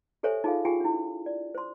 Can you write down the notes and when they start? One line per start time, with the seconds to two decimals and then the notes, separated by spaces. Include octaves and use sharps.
0.23 G4 A4 C5 C#5 E5 G#5
0.44 D#4 F4 G#4 A4 F5
0.65 F4 G4 G#4 G5 G#5
0.80 D4 E4
1.26 D5
1.55 C5 C6